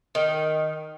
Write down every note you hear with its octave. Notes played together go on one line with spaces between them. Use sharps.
D#3